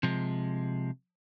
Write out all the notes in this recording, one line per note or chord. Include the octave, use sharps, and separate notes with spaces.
C3 F3 G#3